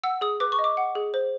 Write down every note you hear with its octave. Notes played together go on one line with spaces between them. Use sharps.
F#5 E6
G#4 D#6
B4 D6
C#6
D#5
D6
F#5
G#4
C5